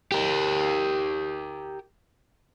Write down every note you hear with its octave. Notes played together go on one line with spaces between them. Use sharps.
G4 A#4